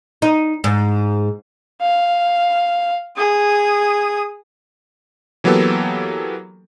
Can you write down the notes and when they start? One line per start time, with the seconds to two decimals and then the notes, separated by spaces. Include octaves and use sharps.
0.22 D#4
0.64 G#2
1.81 F5
3.17 G#4 D#6
5.44 E3 F#3 A#3 B3 G4 A4